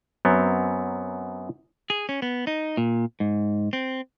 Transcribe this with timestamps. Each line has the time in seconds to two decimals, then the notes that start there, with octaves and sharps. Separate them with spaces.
0.25 F#2 F#3 B3 C4
1.90 G#4
2.09 C#4
2.22 B3
2.47 D#4
2.77 A#2
3.20 G#2
3.73 C4